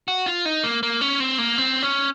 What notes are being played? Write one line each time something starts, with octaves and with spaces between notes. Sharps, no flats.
F#4
F4
D#4
A#3
A#3
C#4
C4
A#3
C4
C#4